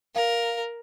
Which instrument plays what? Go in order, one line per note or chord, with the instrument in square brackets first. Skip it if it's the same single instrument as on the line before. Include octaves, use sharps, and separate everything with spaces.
[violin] A#4 [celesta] F5